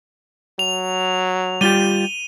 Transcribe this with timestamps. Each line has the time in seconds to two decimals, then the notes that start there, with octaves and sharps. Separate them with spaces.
0.59 F#3 F7
1.61 G3 F4 G4 D#7 G7